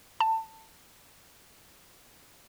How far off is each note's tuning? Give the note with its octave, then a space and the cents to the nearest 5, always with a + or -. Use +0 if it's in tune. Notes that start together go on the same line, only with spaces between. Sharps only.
A5 +20